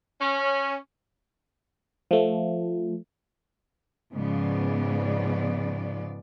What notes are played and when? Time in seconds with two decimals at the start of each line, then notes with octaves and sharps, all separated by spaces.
0.20 C#4
2.11 F3 A3
4.12 G#2 C#3 F3 B3 D5